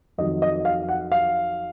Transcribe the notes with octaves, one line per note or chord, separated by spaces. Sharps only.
F2 D#3 F#3 D#5
D#5
F5
F#5
F5